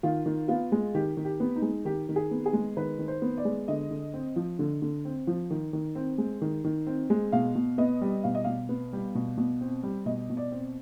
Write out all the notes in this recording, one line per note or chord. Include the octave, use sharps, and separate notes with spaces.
D#3 F4
D#3
B3 F4
G#3
D#3 G4
D#3
G4
B3
D#4
G#3
D#3 G4
D#3
G#4
B3
G#4
G#3
D#3 B4
D#3
C5
B3
D5
G#3
D3 D#5
D3
C4
F3
D3
D3
C4
F3
D#3
D#3
C4
G#3
D#3
D#3
C4
G#3
B2 F5
B2
B3 D#5
G3
B2 F5
D#5
B2 F5
B3
G3
B2
B2
C4
G3
B2 D#5
B2
D5
C4